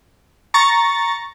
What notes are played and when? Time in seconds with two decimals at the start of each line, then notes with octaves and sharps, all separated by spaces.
0.54 A#5 C#6 A6